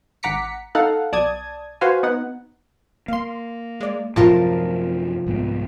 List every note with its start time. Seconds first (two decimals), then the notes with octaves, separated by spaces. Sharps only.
0.23 G#1 F#5 A#5 D6 B6 C#7
0.75 D#4 A4 F5 F#5
1.12 B1 D5 A5 D#6 G#6
1.81 F#4 B4 C5 F5 G#5
2.03 B3 D#4 F#5
3.08 A#3 F5 C6
3.81 G#3 D5
4.16 F#2 A2 C3 F3 F4 A#4 A5
5.27 C2 G#2 B3